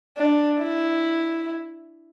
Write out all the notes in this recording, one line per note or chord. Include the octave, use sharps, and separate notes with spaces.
D4
E4